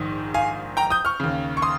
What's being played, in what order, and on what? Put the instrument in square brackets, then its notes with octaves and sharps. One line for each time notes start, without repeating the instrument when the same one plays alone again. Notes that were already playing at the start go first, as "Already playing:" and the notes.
Already playing: [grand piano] A#1 G#2 D#3
F5 G#5
G5 A#5
D#6 G6
C#6 F6
D#2 C#3
C#6
C6 D#6